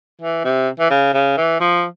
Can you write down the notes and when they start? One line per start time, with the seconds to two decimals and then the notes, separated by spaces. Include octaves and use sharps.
0.21 E3
0.44 C3
0.80 E3
0.90 C#3
1.14 C#3
1.37 E3
1.60 F3